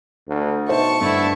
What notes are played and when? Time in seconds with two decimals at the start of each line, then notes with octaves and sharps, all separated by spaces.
0.28 D2
0.69 B2 D#4 C5 E5 A5 C#6
1.01 G2 D3 A3 E4